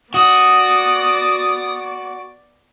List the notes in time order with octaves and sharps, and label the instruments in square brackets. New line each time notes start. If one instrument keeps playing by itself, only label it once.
[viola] B3 D5 [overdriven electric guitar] F#4 [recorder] D#6